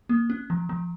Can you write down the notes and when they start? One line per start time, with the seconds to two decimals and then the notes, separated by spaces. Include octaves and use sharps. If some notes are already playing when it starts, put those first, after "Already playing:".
0.09 A#3
0.30 C#4
0.50 F3
0.69 F3